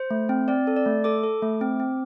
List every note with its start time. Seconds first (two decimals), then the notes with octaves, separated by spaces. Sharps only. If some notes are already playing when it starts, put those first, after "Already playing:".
Already playing: C5
0.11 A3
0.29 C4
0.48 C4 D5
0.67 A4
0.76 D5
0.86 A3
1.04 A4 D6
1.24 A4
1.42 A3
1.61 C4
1.80 C4